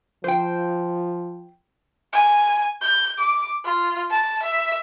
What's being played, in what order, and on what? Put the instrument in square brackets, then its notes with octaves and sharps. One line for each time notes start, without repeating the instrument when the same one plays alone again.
[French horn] F3 [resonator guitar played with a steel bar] C5 G5
[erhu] G#5
G6
D6
F4
A5
E5